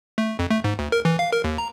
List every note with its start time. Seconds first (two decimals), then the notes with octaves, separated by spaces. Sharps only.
0.18 A3
0.39 F2
0.50 A3
0.64 G#2
0.79 D2
0.92 A#4
1.05 E3
1.19 F5
1.33 A#4
1.44 D#2
1.58 A#5